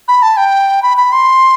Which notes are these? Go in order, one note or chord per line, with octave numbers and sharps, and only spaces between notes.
B5
A5
G5
B5
B5
C6